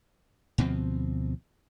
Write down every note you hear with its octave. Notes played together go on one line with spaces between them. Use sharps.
D2 B2 F3 C4